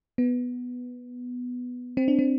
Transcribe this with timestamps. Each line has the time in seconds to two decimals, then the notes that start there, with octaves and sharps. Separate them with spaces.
0.18 B3
1.97 C4
2.08 D4
2.19 C4